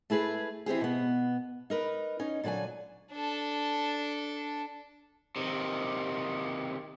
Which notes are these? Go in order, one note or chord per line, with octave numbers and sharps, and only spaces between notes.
A3 E4 G#4 B4
E3 C4 G4 G#4
B2 B3
D#4 A#4 B4
C#4 D#4
A#2 D3 F#3 D5 G#5
D4 A4
C3 D#3